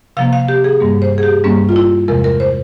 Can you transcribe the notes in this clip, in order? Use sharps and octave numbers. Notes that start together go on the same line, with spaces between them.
C3 F3 A#3 F5
F5
G4
G#4
G2 G3 A#3
C5
G#4
G4
G2 G3 A#3 C#4
F4
E4
E2 C3 F3 G#3 A#4
A#4
C5